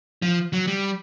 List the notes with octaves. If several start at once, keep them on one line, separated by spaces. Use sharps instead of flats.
F3
F#3
G3